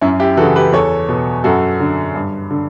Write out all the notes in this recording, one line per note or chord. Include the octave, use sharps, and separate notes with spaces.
F#2 C#4 E4
E4 G4
C#3 E3 F#4 A4
G4 B4
E2 A4 C#5
B2
F#2 F#4 A4
D3
G2
D3